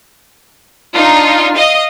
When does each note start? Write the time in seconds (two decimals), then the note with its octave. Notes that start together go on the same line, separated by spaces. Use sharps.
0.93 D4 D#4 F4
1.56 D#5 F5 D#6